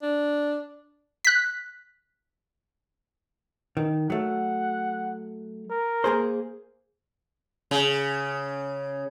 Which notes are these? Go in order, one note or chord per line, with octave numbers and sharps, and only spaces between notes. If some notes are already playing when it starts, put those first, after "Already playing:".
D4
F#6 B6
D#3
F#3 A3 F#5
A#4
A#3 G#4 C5
C#3